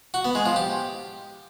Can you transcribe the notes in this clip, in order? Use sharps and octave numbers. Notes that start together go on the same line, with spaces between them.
F#4
B3
G#3
F3
G4